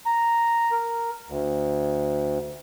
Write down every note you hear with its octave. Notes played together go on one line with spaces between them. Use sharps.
A#5
A#4
D2